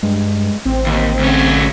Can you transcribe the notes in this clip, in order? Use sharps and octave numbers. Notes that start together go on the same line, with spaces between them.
G2 G#3
A1 C4
D#2
D2 C#4